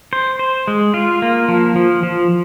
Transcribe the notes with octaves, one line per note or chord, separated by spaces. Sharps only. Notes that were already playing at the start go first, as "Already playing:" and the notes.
C5
C5
G#3
F4
A#3
F3
F3
F3